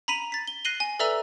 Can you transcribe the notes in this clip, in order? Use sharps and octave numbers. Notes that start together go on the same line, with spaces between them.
A#5 B5 B6 D#7 F7
A6 B6
G7
F#6 A#6 C7 D#7 F#7 G7
G#5
A4 B4 D5 E5 A#5 E6